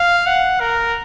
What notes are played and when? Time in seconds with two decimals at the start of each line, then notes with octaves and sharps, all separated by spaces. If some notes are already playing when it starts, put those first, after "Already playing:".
Already playing: F5
0.27 F#5
0.60 A#4